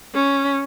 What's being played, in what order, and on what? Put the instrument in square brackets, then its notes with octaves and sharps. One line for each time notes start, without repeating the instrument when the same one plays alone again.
[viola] C#4